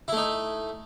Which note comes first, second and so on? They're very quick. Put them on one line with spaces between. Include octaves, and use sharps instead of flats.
E4 A3 D#4